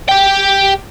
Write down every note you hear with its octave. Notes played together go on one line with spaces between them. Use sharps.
G4 G5